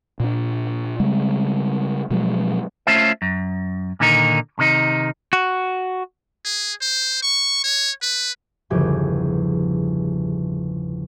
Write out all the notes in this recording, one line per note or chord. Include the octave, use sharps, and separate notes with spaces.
A#2 D4
C#3 G3 G#3
B2 F3 F#3 G#3
A3 C#4 F4 C5 E5
F#2
A#2 D3 D#3 D#4 A#4
C3 D#3 D#4
F#4
G#4
C5
C#6
C#5
B4
G1 E2 C#3 F3 G4 G#6